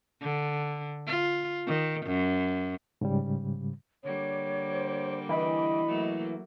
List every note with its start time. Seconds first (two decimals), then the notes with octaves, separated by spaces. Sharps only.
0.22 D3
1.07 F4
1.67 D#3
2.06 F#2
3.01 G#2 C#3 G3
4.04 D3 G3 A#3 C#5
4.72 C5
5.29 E3 D#5 B5
5.86 F#3 A3 A#3